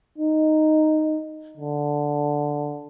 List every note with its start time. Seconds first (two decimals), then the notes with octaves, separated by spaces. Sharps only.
0.18 D#4
1.57 D3